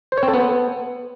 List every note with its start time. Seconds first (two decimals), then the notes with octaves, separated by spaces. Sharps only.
0.12 C5
0.17 C#5
0.23 C4
0.28 A4
0.34 B3